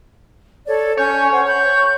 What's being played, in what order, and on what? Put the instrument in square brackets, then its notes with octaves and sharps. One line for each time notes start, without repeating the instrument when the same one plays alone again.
[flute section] A4 C#5 D5
[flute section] C#4 G#5 G6 [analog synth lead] C#5
[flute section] A4 C5 F#5
B5 G6